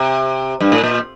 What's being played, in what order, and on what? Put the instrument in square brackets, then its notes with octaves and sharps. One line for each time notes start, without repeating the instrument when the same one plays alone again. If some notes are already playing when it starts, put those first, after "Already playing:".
Already playing: [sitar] C3
G2
A2
A#2